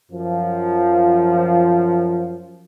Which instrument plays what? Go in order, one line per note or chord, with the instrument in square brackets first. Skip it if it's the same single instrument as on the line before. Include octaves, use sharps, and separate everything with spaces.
[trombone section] F#2 F3